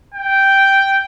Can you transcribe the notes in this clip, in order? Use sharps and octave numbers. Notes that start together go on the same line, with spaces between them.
G5